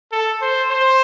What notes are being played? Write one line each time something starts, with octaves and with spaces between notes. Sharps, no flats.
A4
C5
C5